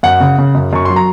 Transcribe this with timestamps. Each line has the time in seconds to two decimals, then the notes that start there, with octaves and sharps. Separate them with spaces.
0.03 F#2 F#5
0.20 C#3
0.38 C#3
0.55 F#2
0.73 F#2 C#6
0.85 F#3 C6
0.96 A#5